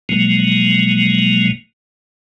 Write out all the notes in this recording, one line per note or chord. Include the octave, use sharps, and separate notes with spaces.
B2 F3 F#3 G#3 A#3